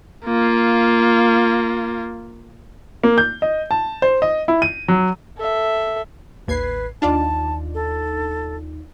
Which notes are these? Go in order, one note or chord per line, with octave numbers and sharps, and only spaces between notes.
A#3 F4
A#3
G6
D#5
A5
C5
D#5
E4
D#7
F#3
A4 E5
A1 D#2 B4 G#6 C7
D#2 D4 D#4 F4 D5 A5
A4